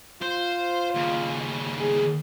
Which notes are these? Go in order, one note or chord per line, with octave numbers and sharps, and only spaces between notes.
F4 C5
D#2 C#3
G#4